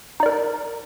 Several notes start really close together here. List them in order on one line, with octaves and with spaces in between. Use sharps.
D#4 D5 A#4